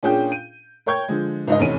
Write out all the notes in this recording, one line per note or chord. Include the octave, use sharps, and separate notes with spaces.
A#2 C#4 D4 G#4 G5 G6
D#7
A#4 C#5 G5 C#6 G6 G#6
D3 F3 G#3
C#2 G#2 D#5
F1 E2 C#4 D#7